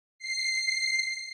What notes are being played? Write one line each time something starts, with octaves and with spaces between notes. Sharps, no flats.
C7